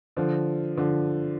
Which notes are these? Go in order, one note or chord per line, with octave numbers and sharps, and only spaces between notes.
D3 F3
D3 F3